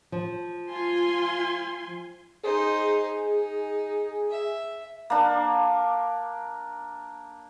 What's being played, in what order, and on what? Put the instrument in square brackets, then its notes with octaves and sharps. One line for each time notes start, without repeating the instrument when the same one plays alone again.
[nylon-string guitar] F3
[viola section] F4 G#5 C6
[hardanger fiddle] D#4 C5 [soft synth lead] G#4
[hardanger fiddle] D#4
E5
[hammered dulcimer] A#3 D4